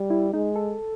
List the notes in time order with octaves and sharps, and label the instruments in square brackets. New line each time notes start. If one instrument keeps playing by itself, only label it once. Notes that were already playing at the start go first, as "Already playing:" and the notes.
Already playing: [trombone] G3
[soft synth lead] E4
[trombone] G#3 [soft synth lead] D#4
[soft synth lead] A4